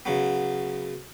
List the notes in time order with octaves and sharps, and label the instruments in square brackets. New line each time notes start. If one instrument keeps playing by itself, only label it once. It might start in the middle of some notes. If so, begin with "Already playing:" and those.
[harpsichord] C#3 F#3 B3